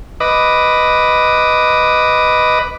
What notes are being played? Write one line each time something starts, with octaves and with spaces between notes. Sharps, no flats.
B4 D#5 D6